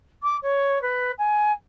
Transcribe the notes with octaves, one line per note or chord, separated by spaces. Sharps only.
D6
C#5
B4
G#5